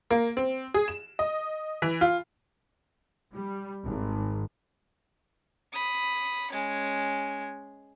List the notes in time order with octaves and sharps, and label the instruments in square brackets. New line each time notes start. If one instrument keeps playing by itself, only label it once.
[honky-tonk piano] A#3
C4
G#4
E7
D#5
E3
F4
[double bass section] G3
G#1
[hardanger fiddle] B5 D#6
G#3 C#4